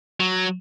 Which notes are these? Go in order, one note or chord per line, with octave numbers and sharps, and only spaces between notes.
F#3